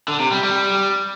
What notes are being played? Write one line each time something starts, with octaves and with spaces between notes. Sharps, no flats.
D3
C3
G3
G3